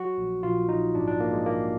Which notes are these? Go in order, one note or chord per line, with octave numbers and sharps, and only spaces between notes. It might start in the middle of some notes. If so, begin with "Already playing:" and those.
Already playing: F#3 F#4
A#1
A#1 F4
A#1 D#4
G#2 D4
D4
A#1 A#3
G#3
A#1 A#3